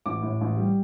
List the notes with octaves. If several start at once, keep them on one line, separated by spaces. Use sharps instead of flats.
A1 D6
A2
A1
G3